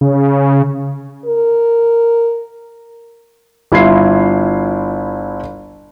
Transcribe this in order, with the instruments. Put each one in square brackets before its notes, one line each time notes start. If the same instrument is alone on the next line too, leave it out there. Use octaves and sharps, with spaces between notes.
[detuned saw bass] C#3
[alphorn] A#4
[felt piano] G1 E4 F4 G#6 C7